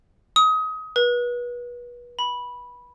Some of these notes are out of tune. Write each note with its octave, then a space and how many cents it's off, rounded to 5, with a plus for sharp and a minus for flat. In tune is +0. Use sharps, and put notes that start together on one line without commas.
D#6 +25
B4 -30
B5 -10